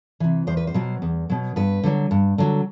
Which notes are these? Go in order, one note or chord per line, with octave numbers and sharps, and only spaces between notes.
C3 E3
E2 C5
B4
C5
B2 F#3
E2
B2 F#3
G2 B4
D3 F#3
G2
D3 F#3